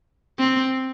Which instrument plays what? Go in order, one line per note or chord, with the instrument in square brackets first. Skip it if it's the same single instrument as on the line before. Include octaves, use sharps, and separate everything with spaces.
[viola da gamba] C4